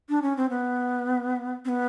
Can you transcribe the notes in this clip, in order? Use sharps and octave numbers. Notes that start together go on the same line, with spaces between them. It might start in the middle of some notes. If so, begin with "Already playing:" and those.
D4
C#4
C4
B3
C4
B3